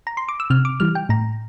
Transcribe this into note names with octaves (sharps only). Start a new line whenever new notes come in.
A#5
C6
D6
E6
C3 F6
D6
E3 G3 F6
G5
A2 A#5